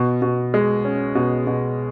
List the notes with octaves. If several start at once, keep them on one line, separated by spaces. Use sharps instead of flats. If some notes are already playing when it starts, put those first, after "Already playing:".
Already playing: B2
B2
G#3
C#4
B2
B2